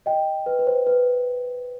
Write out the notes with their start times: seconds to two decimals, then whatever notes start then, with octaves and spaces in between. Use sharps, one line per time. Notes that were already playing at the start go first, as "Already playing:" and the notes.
0.06 D#5 G5
0.46 B4
0.59 B4
0.67 C5
0.87 B4